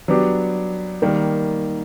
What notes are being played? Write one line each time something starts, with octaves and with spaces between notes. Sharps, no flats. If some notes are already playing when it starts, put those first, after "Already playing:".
F#3 B3 D4 G4
D#3 G3 A#3